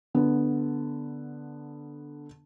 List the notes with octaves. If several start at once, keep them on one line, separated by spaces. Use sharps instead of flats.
D3 B3